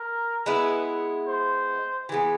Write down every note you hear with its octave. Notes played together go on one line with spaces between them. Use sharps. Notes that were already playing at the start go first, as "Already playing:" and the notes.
Already playing: A#4
G#3 B3 E4 B4
C5
E3 G#3 B3